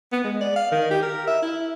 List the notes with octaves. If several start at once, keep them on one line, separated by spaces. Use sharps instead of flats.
B3
G#3
D5
F5
D#3
G4
A#4
E5
E4